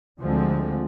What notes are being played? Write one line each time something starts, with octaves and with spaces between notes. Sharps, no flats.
D2 D3 F3 G#3 C4